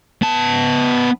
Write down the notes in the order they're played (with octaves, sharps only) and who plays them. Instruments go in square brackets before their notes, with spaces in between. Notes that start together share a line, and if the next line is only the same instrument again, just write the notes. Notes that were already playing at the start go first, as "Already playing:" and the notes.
[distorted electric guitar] B3 A5